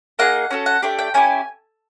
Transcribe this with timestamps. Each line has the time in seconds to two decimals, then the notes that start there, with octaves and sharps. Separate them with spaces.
0.19 A#3 D#4 G#4 F#5
0.51 C#4 F#4 A4
0.66 F#5
0.82 A3 D4 G4 G5
0.99 G5
1.14 C#4 E4 G4 G#5